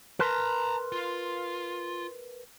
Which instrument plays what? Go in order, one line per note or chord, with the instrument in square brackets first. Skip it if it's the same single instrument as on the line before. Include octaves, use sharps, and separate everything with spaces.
[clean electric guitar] A#4 B4 C6 [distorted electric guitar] A5 A#5
[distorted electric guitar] F4